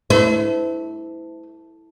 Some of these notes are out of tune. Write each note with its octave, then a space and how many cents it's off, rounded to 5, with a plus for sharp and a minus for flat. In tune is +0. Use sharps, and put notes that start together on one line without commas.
A3 +0 E4 -15 C5 -45